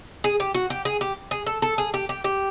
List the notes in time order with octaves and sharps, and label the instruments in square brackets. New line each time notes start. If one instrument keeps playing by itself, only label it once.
[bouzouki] G#4
G4
F#4
G4
G#4
G4
G#4
A4
A4
G#4
G4
G4
G4